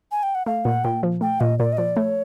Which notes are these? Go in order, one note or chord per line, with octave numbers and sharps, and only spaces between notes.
G#5
G5
F#5
A3 F5
A#2 F#5
A#2 G5
F3
A3 G5
A#2 D#5
A#2 D5
D#5
F3 D5
A3 C#5